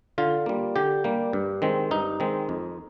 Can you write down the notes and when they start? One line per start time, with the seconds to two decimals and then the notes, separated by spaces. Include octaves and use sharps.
0.18 D3 F4
0.46 G3 A#3
0.76 D3 G4
1.04 G3 A#3
1.33 G2
1.62 D#3 G#3 C4
1.91 G2 D#4
2.20 D#3 G#3 C4
2.49 F2